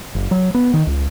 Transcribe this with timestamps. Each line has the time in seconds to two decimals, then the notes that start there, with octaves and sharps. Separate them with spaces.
0.15 F#1
0.31 F#3
0.54 B3
0.74 D#3
0.87 C#2